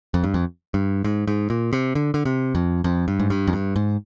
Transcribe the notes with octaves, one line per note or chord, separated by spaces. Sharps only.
F2
G2
F2
G2
G#2
G#2
A#2
C3
D3
D3
C3
F2
F2
G2
G#2
G2
F2
G2
G#2